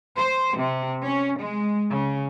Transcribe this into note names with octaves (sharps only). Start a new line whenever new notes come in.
C5
C3
C#4
G#3
C#3